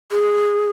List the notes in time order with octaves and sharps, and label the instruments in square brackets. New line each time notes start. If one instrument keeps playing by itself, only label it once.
[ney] G#4